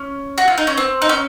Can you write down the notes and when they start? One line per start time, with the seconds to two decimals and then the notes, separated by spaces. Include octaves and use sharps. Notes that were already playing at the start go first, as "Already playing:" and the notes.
Already playing: C#4
0.38 F#4
0.48 F4
0.58 D#4
0.67 C#4
0.78 C4
1.02 D#4
1.09 C#4